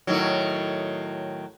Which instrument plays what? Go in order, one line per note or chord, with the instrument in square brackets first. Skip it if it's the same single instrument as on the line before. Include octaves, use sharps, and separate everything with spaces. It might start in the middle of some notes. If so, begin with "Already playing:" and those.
[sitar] A2 D#3 F#3